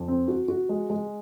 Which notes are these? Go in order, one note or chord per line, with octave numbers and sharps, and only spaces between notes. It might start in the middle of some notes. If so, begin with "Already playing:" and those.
Already playing: F2
C4
F#4
F#4
G#3
G#3